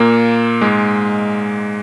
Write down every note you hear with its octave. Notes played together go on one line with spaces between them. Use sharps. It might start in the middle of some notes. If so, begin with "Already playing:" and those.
Already playing: A#2 A#3
G#2 G#3